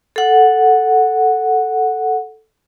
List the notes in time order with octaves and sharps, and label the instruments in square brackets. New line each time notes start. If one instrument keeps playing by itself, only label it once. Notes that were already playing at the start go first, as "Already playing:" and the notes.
[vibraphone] A4 F#5